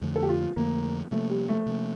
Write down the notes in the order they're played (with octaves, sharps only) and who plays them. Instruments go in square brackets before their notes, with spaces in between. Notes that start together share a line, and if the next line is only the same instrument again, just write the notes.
[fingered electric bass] F2 D3 F3 A3
[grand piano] A4
G4
F4
[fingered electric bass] F2 D3 F3 A3 [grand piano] A#3
[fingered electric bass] C3 F3 A#3 [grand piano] A3
[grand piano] G3
A3
[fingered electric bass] C3 F3 A#3